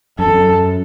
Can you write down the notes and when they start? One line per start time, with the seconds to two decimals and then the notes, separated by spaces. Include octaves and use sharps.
0.18 F#2 A4
0.26 F2
0.33 F#2